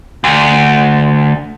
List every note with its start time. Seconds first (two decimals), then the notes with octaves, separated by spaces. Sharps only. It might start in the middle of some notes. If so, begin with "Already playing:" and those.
0.24 D2